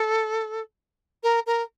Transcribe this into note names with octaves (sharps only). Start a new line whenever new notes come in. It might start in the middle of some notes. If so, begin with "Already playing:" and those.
Already playing: A4
A#4
A#4